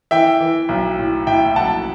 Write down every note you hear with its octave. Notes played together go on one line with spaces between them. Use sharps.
E3 E5 G5
E3
B1
A2
A2 E5 G5
B1 F#5 A5